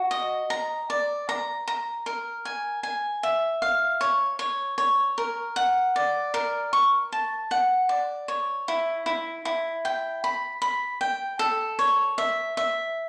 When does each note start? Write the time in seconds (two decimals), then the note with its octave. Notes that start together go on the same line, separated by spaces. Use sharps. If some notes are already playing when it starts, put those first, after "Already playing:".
Already playing: F#4
0.11 D#5
0.50 A#5
0.90 D5
1.29 A#5
1.68 A#5
2.06 A#4
2.45 G#5
2.83 G#5
3.23 E5
3.62 F5
4.01 C#5
4.39 C#5
4.78 C#5
5.18 A#4
5.56 F#5
5.96 D5
6.34 A#4
6.73 C#6
7.12 A5
7.51 F#5
7.89 D5
8.28 C#5
8.68 E4
9.06 E4
9.45 E4
9.85 G5
10.24 B5
10.62 B5
11.01 G5
11.39 A4
11.79 C#5
12.18 E5
12.57 E5